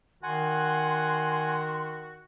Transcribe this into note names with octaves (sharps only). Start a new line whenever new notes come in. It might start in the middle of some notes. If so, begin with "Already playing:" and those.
D#3 F#4 F#5 G#5 C6